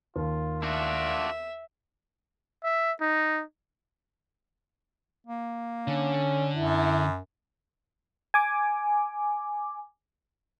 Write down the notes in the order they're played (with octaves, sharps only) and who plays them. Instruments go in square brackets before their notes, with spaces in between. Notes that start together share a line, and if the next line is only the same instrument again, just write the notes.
[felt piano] D#2 [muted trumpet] F4
[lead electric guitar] D4 F#4 [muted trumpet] F4 [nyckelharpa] E5
[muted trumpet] E5
D#4
[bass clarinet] A#3
[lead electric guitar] D3 [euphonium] C#4
[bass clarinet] F#2 [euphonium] E4
[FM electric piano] G#5 D6